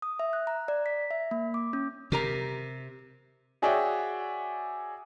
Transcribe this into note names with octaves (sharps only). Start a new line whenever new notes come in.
D#6
E5
F#6
A#5
D5
B6
E5
A#3
D6
C#4
C3 G4 A#4 A#5
F#4 G#4 C#5 D5 E5 G5